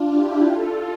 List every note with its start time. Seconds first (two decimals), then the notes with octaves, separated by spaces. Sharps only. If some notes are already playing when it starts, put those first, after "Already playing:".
Already playing: D4 F4
0.09 E4 G4
0.44 F4 A4